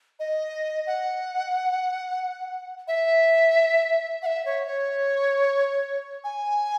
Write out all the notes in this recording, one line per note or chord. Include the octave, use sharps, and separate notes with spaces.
D#5
F#5
E5
F#5
E5
C#5
C#5
G#5